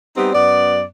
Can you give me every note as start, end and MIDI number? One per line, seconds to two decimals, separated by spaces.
0.16 0.32 55
0.16 0.32 59
0.16 0.32 60
0.16 0.32 63
0.16 0.32 67
0.33 0.83 42
0.33 0.83 59
0.33 0.83 74